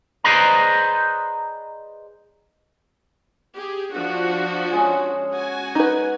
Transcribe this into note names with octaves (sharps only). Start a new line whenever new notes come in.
G#4 B4 C5 D5 D#5 A#5
G4 G#4
F3 D4 F#4 F#5
G#3 C#4 G#4
F#4 G#5
D#4 B4 D5 F#5